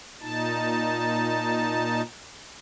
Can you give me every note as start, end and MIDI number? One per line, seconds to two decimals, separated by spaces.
0.21 2.02 46
0.21 2.02 63
0.21 2.02 81